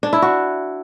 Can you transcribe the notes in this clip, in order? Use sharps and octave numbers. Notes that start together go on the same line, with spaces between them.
D4
E4
F#4